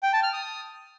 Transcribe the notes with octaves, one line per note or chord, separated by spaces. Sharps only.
G5
A5
F6
D#6